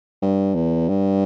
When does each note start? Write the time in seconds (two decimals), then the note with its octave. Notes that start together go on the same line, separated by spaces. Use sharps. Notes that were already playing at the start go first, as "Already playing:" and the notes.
0.22 G2
0.55 E2
0.89 G2